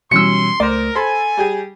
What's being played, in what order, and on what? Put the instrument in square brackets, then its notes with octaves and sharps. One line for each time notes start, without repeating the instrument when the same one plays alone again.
[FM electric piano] B2 E3 G3 [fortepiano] F#3 C#4 E6 [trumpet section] C6 [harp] C#7
[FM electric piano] C#2 A3 D#6 [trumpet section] A#4 [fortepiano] C5 D5
[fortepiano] A4 B5 C6 [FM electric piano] C5 E6 A6 [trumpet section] G#5
[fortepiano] G3 G4 G#4